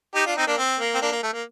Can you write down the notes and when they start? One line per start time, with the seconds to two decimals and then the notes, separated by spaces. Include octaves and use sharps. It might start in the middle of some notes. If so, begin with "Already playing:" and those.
0.15 D#4 G4
0.26 D4 F4
0.37 C4 D#4
0.47 A#3 D4
0.58 C4
0.80 A#3
0.95 C4
1.02 A#3 D4
1.12 A#3
1.23 A3
1.33 A#3